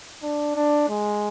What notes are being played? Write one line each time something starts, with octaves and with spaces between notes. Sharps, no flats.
D4
D4
G#3